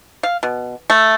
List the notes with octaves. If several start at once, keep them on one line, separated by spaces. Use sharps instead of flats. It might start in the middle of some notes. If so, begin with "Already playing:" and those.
F5
B2
A3